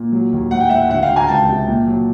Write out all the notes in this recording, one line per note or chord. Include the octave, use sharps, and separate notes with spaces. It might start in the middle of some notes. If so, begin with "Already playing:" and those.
Already playing: A#2
F#3
D#2
A2 F#5
G5
A2 E5 F#5
D2 E5 F#5
F5 G5
D2
G#5 A#5
C#2 G5 A5
C3
A#2
F#3